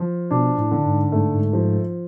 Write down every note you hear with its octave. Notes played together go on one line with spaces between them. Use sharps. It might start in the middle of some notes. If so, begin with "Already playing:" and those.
Already playing: F3
B2 D4
A2
D3
G#2
G#2 A3
G#2
F3